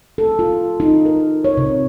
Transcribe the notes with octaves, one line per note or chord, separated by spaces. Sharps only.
A4
F4
D#4
A#4
C#5
C3